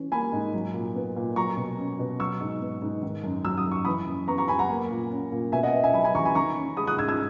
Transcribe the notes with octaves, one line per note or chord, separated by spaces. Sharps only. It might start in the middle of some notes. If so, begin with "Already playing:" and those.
Already playing: E3 C#4
A#3 G#5 B5
G#2
F#3
A#2
B3
A#2
F#3 A#5 C#6
B2
C#4
B2
F#3 C#6 E6
G#2
B3
G#2
D#3
F#2
F#3 E6
D#6
F#2
C#6
E3 B5 D#6
F#2
B3 A#5 C#6
A#5 C#6
F#2 G#5 B5
F#5 A#5
A#3
A#2
C#4
A#2
B2 E5 G#5
D#5 F#5
B3 E5
E5 G#5
F#3 G#5 B5
G#5 B5
E2 A#5 C#6
G#5 B5
D#3 A#5 C#6
C#4
G#3 B5 D#6
D#6 F#6
G#2 E6 G#6
E6 G#6